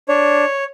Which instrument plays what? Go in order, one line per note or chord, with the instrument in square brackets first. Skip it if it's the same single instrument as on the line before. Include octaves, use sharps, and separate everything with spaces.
[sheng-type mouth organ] D4 C#5